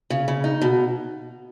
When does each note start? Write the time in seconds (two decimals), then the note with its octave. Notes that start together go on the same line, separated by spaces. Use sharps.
0.10 C#3
0.28 C#3
0.44 D#4
0.61 B2